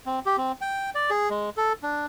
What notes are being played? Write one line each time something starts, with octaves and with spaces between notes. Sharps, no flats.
C4
G4
C4
G5
D5
G#4
G#3
A4
D4